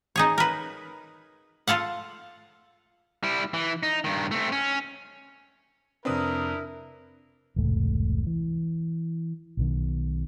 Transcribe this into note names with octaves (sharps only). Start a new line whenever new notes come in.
D#4 G#4 C#5
A#4 B4
F4 A4 F5 F#5
G3 E4
E3
D#4
G2 D#3
A3 C4
C#4
F2 C3 C4 D4 E4 A#4 B4 D#6
E1 C2 G#2 A3
E3
B1 B2 D#3